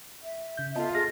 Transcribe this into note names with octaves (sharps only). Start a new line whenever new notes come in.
E5
C#3 G6
B3 F4 A4 D#5 A5
G#4 F6 A6 A#6